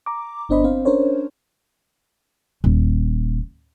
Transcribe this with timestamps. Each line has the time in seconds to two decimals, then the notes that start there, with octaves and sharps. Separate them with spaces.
0.06 A#5 D6
0.49 G1 B3 D4 C5 D#5 B5
0.64 C4 C5 F5
0.85 C#4 D4 A#4 C5 C#5
2.64 D#1